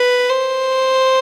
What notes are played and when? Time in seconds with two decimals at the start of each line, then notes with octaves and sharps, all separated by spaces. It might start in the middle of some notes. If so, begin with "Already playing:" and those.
Already playing: B4
0.30 C5